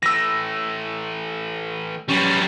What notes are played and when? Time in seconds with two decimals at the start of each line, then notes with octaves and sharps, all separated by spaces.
0.03 E3 A3 E6 A#6
2.09 F#3 G3 C#4 B4 C#5